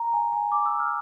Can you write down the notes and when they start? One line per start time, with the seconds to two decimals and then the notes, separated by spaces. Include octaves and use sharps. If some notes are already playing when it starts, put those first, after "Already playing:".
Already playing: A#5
0.13 G#5
0.32 G#5
0.52 D6
0.66 E6
0.79 F6